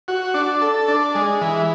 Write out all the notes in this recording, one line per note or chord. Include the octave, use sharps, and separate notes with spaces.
F#4
D4
A4
D4
G#3
E3